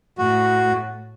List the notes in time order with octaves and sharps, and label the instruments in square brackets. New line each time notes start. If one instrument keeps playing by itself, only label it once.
[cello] A2 [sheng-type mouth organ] F#4